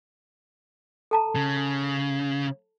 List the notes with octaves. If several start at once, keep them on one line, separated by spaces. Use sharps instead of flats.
A4 A5 A#5
C#3